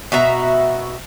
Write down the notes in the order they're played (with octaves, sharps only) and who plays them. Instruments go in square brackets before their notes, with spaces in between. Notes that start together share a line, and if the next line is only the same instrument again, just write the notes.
[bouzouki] B2 F#4 E5 A#5